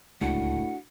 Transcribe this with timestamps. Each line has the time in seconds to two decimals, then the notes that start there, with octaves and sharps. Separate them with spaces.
0.21 D1 C#2 A2 G#3 D4 F#4 F#5